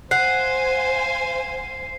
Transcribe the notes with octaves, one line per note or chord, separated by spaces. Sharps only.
C5 F5 F#5 G#5 C7